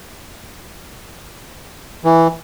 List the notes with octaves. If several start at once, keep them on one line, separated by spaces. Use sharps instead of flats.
E3